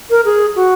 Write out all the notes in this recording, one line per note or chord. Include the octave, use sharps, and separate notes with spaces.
A#4
G#4
F#4